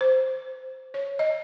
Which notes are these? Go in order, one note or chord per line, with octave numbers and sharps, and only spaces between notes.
C5
C#5
D#5